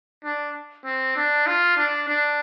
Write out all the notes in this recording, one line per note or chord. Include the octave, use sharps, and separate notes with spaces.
D4
C4
D4
F4
D4
D4